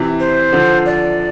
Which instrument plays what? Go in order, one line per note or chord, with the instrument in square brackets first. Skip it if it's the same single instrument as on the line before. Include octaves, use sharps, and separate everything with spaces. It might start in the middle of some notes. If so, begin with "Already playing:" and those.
Already playing: [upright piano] C3 E3
[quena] C5
[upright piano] D3 F3
[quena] D5